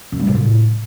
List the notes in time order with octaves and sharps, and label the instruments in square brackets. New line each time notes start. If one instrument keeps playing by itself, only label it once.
[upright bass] F#2
G3
A#2
A2